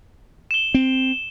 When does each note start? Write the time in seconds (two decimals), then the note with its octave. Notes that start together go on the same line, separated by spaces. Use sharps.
0.51 E7 G7
0.74 C4